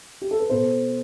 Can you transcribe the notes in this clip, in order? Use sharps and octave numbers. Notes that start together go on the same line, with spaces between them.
G4
A4
B4
B2 A4 C5